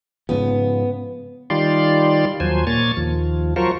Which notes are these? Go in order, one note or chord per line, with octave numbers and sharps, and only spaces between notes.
G#2 C#3 F3 B3
D#3 G3 F4 D5 C6
D#2 F3 F#3 C5 G#5
A#2 A#3 C#5 G#5 A6
D#2 F3
F3 F#3 F4 A#4 C5 C#6